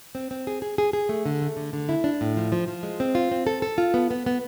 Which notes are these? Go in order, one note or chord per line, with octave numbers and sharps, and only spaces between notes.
C4
C4
G#4
G#4
G#4
G#4
A3
D3
A3
D3
D3
E4
D4
A2
F3
F3
F3
G#3
C4
F4
C4
A4
A4
F4
B3
B3
B3